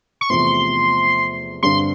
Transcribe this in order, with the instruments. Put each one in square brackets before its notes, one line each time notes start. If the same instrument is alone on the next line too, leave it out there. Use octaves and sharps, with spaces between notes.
[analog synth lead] C#6
[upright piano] E2 C3 F3 A3 [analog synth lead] C6
[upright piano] G2 D3 G3 C4 [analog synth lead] C6